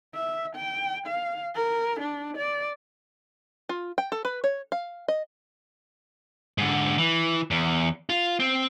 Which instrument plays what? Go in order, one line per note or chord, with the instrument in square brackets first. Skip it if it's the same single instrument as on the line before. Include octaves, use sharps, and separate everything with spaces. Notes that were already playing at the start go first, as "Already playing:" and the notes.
[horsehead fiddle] E5
G5
F5
A#4
D4
D5
[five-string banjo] F4
G5
A4
B4
C#5
F5
D#5
[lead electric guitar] G#2 D3
E3
E2
F4
C4